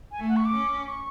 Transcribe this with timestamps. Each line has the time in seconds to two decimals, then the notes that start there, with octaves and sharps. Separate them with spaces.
0.11 G#5
0.19 A3
0.29 F#5
0.36 C#6
0.45 D6
0.54 C#4
0.88 C#6